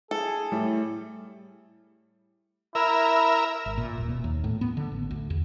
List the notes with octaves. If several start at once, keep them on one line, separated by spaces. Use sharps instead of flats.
G#4 A4
A2 G3
E4 A#4 E5
G#1
A#2
D#1
B2
D#2
A2
B3
D3
A1
D2
E2